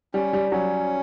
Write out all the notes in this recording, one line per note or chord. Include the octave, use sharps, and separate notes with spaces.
G3 C#4
G3
F#3 C#4